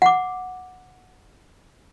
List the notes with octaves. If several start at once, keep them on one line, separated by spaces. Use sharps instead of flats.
F#5 D6